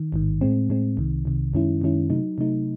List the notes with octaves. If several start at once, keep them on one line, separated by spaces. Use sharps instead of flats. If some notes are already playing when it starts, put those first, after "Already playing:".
Already playing: D#3
A1 G#2 D#3
A2 G#3 C4
A2 G#3 C4
C2 C3 D#3
C2 C3 D#3
F#2 D#3 G#3 C#4 E4
F#2 D#3 G#3 C#4 E4
C3 F#3 A3 D#4
C3 F#3 A3 D#4